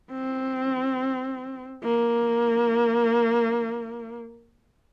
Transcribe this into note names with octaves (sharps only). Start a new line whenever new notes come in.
C4
A#3